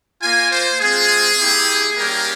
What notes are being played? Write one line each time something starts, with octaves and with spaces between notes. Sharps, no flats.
A#3 F4 G#5
C5
G#3 C4 F4 G#4
A#3 E4 G4
G3 A#3 C#4 G4 A#4